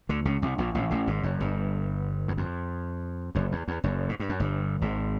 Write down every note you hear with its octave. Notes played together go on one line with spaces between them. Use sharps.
D2 D3
C#2 C#3
C2 C3
A#1 A#2
A1 A2
A1 A2
G#1 G#2
F#1 F#2
G1 G2
E2
F2
F#1 F#2
E2
E2
F#1 F#2
G#2
G2
F#2
G1 G2
G#1 G#2